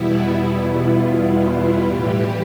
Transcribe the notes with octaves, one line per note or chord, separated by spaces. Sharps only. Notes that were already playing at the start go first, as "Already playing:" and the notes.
Already playing: E2 B2 G3 B3 E4
E4
F4
A2 E3 G3 G4